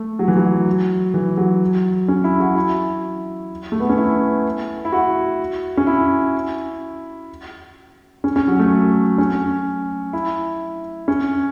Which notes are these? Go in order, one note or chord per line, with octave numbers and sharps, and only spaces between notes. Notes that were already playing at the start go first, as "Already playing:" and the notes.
Already playing: A3
F#3
E3
F#3
E3
F#3
C#4
E4
F#4
E4
A3
B3
C#4
E4
E4
F#4
C#4
E4
C#4
C#4
F#3
A3
C#4
E4
C#4